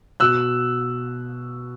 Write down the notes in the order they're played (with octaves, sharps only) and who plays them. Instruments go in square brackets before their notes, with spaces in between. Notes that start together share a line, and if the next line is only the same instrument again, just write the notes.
[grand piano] B2 E6 F#6